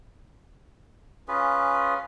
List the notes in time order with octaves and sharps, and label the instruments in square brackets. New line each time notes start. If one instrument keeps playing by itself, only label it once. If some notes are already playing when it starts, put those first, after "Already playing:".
[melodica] C#4 F4 G#4 B4